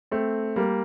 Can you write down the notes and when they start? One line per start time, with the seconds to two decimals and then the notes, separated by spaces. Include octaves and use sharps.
0.11 A3 C4
0.56 G3 A#3